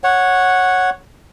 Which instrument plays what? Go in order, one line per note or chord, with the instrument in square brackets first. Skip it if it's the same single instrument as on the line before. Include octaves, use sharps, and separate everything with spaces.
[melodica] C#5 F#5